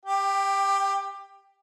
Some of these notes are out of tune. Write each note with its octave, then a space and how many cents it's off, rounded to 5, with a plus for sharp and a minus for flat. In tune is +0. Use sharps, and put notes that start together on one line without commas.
G4 +20 G5 +0